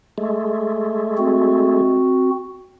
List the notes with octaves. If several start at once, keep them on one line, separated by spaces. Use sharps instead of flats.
G#3 A3
C4 F#4